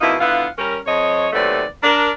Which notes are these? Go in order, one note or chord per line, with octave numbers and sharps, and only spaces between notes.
F2 B2 A#3 D#4 E4
D3 B3 E4 F4 F5 F#5
G3 C#4 A#4
F2 C#5 D#5
D#2 C3 F#3 A3 B4 D5
D4 A#4